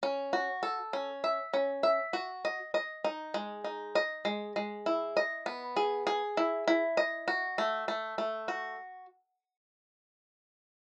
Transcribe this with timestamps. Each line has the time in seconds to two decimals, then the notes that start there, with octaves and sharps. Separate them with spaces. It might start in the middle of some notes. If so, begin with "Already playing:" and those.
0.03 C#4
0.33 F#4
0.63 A4
0.93 C#4
1.24 E5
1.54 C#4
1.83 E5
2.13 F#4
2.45 D#5
2.74 D#5
3.04 D#4
3.34 G#3
3.64 D#4
3.95 D#5
4.25 G#3
4.56 G#3
4.86 E4
5.17 D#5
5.46 B3
5.76 G#4
6.07 G#4
6.37 E4
6.68 E4
6.97 D#5
7.28 F#4
7.58 A3
7.88 A3
8.18 A3
8.48 F#4